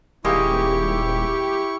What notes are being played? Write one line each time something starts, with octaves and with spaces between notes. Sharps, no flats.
D#1 G#3 A#3 E4 G4 C#6